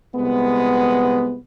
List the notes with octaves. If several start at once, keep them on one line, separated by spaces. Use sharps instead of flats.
C2 G#3 B3